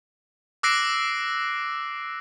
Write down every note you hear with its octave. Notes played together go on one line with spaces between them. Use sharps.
D6 E6 F#6 A#6 C7 D7